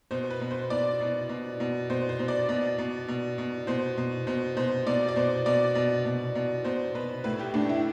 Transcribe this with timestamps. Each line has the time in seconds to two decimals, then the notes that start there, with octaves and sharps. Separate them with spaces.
0.11 B2 C5
0.30 B4
0.41 B2
0.51 C5
0.70 B2 D5
1.01 B2
1.29 B2
1.60 B2
1.90 B2 C5
2.09 C5
2.19 B2
2.28 D5
2.49 B2
2.78 B2
3.08 B2
3.38 B2
3.67 B2 C5
3.97 B2
4.27 B2 C5
4.57 B2 C5
4.87 B2 D5
5.09 D5
5.16 B2 C5
5.46 B2 D5
5.75 B2
6.05 B2
6.35 B2
6.64 B2 C5
6.95 B2 B4
7.24 A2 B4
7.39 G4
7.54 A2 D4
7.69 E4